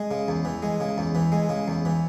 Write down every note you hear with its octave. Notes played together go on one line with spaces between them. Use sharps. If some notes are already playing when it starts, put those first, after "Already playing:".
Already playing: G#3
C#3
E2
E3
G#3
C#3
E2
E3
G#3
C#3
E2
E3